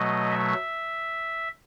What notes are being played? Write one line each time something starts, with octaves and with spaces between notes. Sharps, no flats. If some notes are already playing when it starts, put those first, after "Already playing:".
Already playing: B2 F#3 A3 D#5
E5